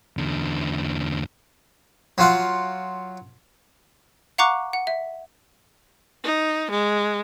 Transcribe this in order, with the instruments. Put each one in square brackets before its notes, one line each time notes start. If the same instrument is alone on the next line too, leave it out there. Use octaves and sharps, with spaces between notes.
[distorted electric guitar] E2 D3
[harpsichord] F#3 F4 F#5
[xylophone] F5 F#5 A#5 C#6 D6 F#6
F#5
E5
[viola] D#4
G#3